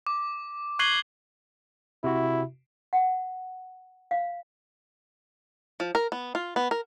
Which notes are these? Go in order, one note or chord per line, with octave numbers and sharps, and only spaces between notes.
D6
C#6 F#6 G#6 C7 F#7 G7
C3 E4 F#4
F#5
F5
F3
A#4
B3
F4
B3
A#4